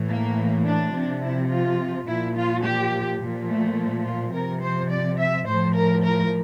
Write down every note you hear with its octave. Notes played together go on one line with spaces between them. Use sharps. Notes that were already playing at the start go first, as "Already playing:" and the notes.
Already playing: A2 E3
A#3
D4
C3 F3
E4
F4
A#2 F3 E4
F4
G4
A#2 F3
A3
F4
C3 F3 A#4
C5
D5
E5
A2 F3 C5
A#4
A#4